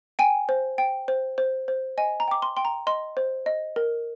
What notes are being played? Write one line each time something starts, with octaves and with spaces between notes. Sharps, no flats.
G5 G#5
C5
G5
C5
C5
C5
D#5 G#5
A#5
G5 D6
C6
G5 C6
A#5
D#5 C6
C5
D#5
A#4